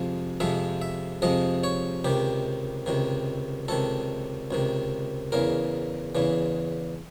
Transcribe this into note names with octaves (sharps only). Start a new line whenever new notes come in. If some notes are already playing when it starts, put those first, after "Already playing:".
Already playing: F2 C3 F3 G#3
F2 C3 F3 G#3 E5
E5
F2 C3 F3 G#3 D#5
C#5
C#2 C3 D#3 G4
C#2 C3 D#3
C#2 C3 D#3 A4
C#2 C3 D#3
E2 C#3 E3 A#4
E2 C#3 E3